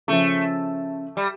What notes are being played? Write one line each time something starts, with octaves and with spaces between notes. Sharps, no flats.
C#3 F3 A3 C#4
G3